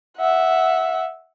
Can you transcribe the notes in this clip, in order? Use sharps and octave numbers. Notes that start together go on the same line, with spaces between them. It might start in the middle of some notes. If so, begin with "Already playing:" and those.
E5 F#5